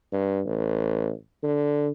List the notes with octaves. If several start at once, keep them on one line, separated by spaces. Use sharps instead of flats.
G2
A1
D3